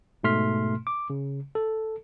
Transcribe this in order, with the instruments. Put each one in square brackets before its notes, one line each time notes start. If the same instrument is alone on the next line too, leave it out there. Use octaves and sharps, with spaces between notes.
[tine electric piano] G#2 B2 A3 C6 F6 B6
D6
C#3
A4